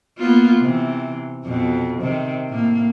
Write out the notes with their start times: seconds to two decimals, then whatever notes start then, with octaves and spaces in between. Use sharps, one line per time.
0.18 A#3 B3 F4
0.60 C3 E3
1.45 F2 B2
2.01 C3 D#3
2.49 A2 A#3